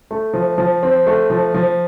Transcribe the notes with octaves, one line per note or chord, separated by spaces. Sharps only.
A3
F3
F3
C4
A3
F3
F3